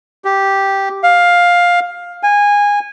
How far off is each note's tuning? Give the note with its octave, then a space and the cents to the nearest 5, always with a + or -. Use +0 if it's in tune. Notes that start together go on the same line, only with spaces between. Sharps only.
G4 -5
F5 +10
G#5 -20